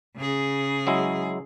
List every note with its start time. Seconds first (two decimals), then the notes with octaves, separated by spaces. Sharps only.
0.17 C#3 G#4
0.87 F#3 G#3 E4